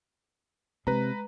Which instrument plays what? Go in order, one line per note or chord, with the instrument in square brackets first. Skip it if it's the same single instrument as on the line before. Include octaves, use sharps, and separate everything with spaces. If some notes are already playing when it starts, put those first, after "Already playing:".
[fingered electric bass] C3 [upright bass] G#3 [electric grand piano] B4 A#5